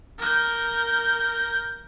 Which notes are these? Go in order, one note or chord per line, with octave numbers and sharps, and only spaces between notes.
A#4 G6